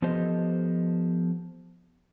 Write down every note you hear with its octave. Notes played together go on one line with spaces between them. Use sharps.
F3 B3 G4 A4 C5 D#5